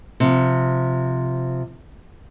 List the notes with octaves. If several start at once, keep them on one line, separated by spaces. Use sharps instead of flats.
C3 F3